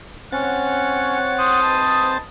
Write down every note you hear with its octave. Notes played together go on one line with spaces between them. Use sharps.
C4 C#4 C#5 F#5 A6
C5 D#6
G#2 B4 A5